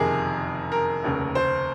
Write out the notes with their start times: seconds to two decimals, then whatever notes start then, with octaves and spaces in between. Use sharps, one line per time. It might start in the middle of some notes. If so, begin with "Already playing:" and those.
Already playing: F#1 F2 C3 D#3 G#4 A#4
0.72 A#4
1.03 F1 D#2 C#3
1.35 C5